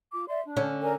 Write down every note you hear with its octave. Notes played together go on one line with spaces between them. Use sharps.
F4 D6
D5 E5 C6
D4
D3 C#4
A#4 D5 G#5